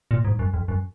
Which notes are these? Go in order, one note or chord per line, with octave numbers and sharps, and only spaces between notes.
A#2
G#2
F#2
F2
F#2